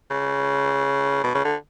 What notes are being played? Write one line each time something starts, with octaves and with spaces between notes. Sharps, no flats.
C#3
B2
C#3
D3